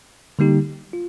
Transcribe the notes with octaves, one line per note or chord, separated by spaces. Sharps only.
D3 G3 A#3 D#4 G4
F4